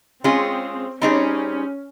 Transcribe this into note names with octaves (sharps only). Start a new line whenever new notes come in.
G#3 C4 C#4 F4 G#4
G3 C4 C#4 D#4 G#4